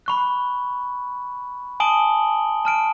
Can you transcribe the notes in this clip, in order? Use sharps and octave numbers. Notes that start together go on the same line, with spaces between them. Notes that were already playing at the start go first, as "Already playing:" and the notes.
B5 C#6 F#6
G#5 A5 D#6 D7 F#7 G7
A5 F6 D7